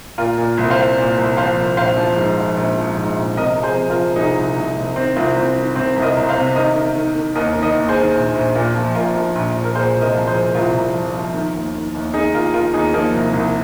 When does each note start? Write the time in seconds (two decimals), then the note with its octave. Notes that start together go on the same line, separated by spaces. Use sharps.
0.18 A#2 F4 A#4
0.38 A#2
0.57 C2
0.70 C5 F5
0.77 C2
0.98 A#2
1.18 C2
1.37 F3 C5 F5
1.57 C2
1.77 A#1 C5 F5
1.97 F3
2.17 G#2
2.37 F3
2.57 A#1
2.77 F3
2.97 G#2
3.16 A#1
3.36 C3 A#4 D#5
3.57 F3
3.63 G#4 C5
3.77 C3
3.90 F4 A#4
3.97 F3
4.16 C2 D#4 G#4
4.36 C2
4.56 C2
4.77 C2
4.96 D#3 C4
5.16 C2 C4 F4
5.36 C2 C4
5.56 D#3
5.76 C2 C4
5.96 C2
6.02 A#4 D#5
6.17 C2
6.29 C5 F5
6.36 C3
6.56 D#3 A#4 D#5
6.76 D#3
6.96 D#3
7.15 D#3
7.35 D#2 A#4 D#5
7.55 D#3
7.63 A#4 D#5
7.75 D#2
7.89 G#4 C5
7.95 D#3
8.15 A#1
8.35 A#1
8.55 A#2
8.75 F3
8.95 A#2 F4 A#4
9.15 F3
9.35 A#1
9.54 A#1
9.64 A#4
9.75 A#2 G#4 C5
9.95 C2
10.01 A#4 D#5
10.15 F3
10.27 G#4 C5
10.35 C2
10.55 C2 F4 A#4
10.74 C2
10.94 F3
11.14 F3
11.34 D#3
11.54 D#2
11.74 D#3
11.94 D#2
12.14 D#3 D#4 G#4
12.33 D#2 F4 A#4
12.54 D#3 F4 A#4
12.73 D#2 D#4 G#4
12.94 F3 A#3 D#4
13.14 C2
13.33 C2